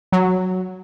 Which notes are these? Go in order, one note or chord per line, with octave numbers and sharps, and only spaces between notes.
F#3